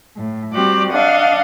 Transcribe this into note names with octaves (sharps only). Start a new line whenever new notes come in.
A2
G3 C4 F#4 G4 D5
D4 D5 D#5 F5 F#5